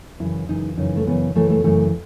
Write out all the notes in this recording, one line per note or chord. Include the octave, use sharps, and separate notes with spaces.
F#2 C#3 E3 E4
F#2 C#3 E3 D#4
F#2 C#3 E3 D#4
A3
F#2 C#3 E3 B3
F#2 C#3 E3 A3
A3
F#2 C#3 E3 A3